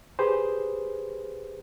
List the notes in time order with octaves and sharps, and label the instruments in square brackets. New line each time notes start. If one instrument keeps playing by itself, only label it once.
[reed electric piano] G4 G#4 B4 C5